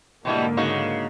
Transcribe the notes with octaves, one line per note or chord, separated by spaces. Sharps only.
G#2 B2 D3 G3 A#3 E4
C#3 D#4 F#4